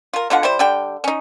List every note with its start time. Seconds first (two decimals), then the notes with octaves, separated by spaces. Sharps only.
0.13 F4 A#4
0.30 B2 D3 F4 F#5
0.43 G3 E4 C5
0.59 D3 G3 G5
1.04 C#4 D#4